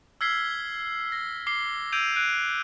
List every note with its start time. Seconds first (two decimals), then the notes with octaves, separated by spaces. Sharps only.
0.21 E6 F6 G#6 B6 C7 G7
1.12 A#6
1.47 D6 C7 G7
1.92 E6 G6 G#6 D7 D#7 F7
2.16 F#6 D7 D#7